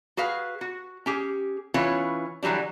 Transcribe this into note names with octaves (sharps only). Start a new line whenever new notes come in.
F#4 G#4 B4 F5
F#4
C#4 G4 G#4
E3 C#4 F4 B4 C#5
D3 E3 F#3 G3 D4